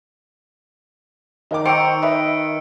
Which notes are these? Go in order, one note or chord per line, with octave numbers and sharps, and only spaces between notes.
D#3 D#4 A#4 D6
C5 G5 A#5 C#6 E6 C#7 D7
B4 D#5 E5